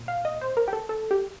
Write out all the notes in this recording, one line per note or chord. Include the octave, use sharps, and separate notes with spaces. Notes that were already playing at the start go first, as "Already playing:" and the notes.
Already playing: A#2
F5
D#5
C5
A#4
G4
A4
A4
G4